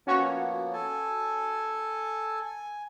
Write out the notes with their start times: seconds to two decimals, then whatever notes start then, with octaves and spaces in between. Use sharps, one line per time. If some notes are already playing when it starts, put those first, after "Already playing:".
0.07 F3 A#3 B3 C#4 F#4 C#5
0.73 A4 G#5 A5
2.45 G#5